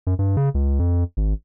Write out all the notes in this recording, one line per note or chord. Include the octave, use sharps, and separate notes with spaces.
F#2
G2
C#3
C#2
F2
G#1